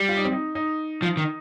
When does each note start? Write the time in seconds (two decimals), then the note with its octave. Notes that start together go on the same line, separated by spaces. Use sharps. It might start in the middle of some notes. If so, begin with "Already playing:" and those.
Already playing: G3
0.09 F4
0.17 D#4
0.25 C4
0.32 D#4
0.55 D#4
1.02 F3
1.17 D#3